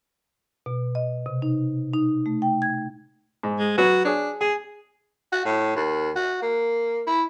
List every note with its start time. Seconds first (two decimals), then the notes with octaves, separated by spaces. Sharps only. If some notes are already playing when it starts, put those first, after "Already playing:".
0.66 B2
0.95 D#5
1.26 C3
1.42 D#4
1.93 D#4
2.26 A3
2.42 G5
2.62 G#6
3.43 G#2
3.59 G#3
3.78 F#3 F#4 B4
4.05 D4 G#4 C#5
4.41 G#4 G#5
5.32 F#4
5.45 A2
5.76 D#2
6.16 F#4
6.42 A#3
7.07 E4